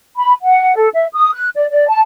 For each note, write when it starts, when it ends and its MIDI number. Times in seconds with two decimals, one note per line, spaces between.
0.16 0.32 83
0.43 0.74 78
0.76 0.87 69
0.93 1.06 76
1.14 1.33 87
1.33 1.48 90
1.55 1.68 74
1.70 1.86 74
1.88 2.00 81